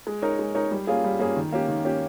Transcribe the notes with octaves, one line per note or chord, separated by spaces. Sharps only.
G#3
D#4 A#4 C#5
G#3
D#4 A#4 C#5
G3
A#3 C#4 F4 G#4
G3
A#3 C#4 F4 G#4
D#3
A#3 C#4 G4
D#3
A#3 C#4 G4